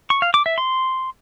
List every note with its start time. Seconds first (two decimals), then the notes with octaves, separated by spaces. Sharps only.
0.10 C#6
0.22 F5
0.34 D6
0.46 E5
0.58 C6